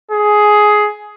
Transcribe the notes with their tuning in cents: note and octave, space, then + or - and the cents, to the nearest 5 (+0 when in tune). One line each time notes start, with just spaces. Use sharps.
G#4 +10